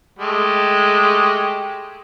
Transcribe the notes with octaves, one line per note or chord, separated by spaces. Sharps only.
G#3 A3 G4